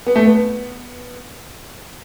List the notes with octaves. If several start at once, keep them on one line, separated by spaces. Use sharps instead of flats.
B3
A3
B3